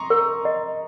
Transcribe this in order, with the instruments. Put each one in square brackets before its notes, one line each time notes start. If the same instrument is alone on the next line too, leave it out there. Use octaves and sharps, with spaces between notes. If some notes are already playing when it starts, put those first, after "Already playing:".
Already playing: [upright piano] A#5 C6 C#6 D#6
[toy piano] A#4
D#5